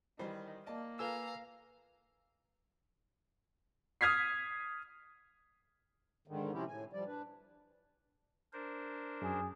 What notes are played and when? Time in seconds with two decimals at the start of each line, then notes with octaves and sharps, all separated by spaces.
0.19 D#3 E3 G3 C5
0.66 A#3 D5 D#5 A5
0.99 F4 A4 B4 F5 G#5 A#5 E6
4.01 D#6 F6 G#6 B6 C7
6.28 G#2 D3 D#3
6.53 C3 F3 C4 C#4 E4 G4
6.68 A2 G#5
6.93 F3 G3 D5
7.07 D4 B4
8.53 D4 A#4 C5
9.22 F#2 G#4